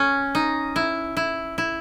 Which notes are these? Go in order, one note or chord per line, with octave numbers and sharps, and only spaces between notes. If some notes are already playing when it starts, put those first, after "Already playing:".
Already playing: C#4
D#4
E4
E4
E4